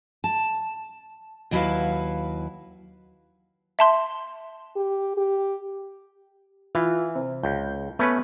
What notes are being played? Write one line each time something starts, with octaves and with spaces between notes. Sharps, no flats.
A5
D#2 F#3 E4 F#4 B4 F5
E5 A5 C6
G4
G4
E3 F4
C3
C#2 G6
A3 B3 C#4 B4